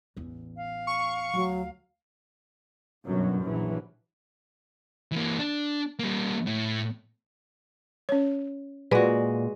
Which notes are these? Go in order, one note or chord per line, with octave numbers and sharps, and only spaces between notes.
A1 E2
F5
C#6
D2 F#3
G1 F#2 B2 F#3
A#1 E3 F#3
E3 A#3
D4
G3 A#3
A2
C#4 C#5
A#2 G#3 F#4 B4 D5